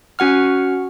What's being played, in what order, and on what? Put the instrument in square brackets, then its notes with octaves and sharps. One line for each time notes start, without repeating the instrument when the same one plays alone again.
[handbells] C#4 F#4 F#5 F6